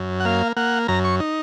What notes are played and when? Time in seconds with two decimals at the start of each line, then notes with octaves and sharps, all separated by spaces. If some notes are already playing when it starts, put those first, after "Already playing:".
Already playing: F#2
0.20 F#5
0.25 A#3 F5
0.57 A#3 F#5
0.88 F#2 A#5
1.04 C#6
1.20 D#4